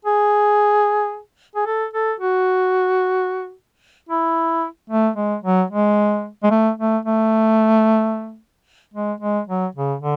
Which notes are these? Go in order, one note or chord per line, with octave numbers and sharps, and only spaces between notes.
G#4
G#4
A4
A4
F#4
E4
A3
G#3
F#3
G#3
G#3
A3
A3
A3
G#3
G#3
F#3
C#3
D3